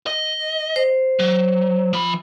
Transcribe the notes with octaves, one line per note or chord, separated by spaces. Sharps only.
D#5
C5
F#3
F3 B5